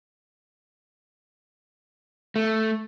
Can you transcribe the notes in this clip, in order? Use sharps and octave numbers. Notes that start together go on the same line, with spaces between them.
A3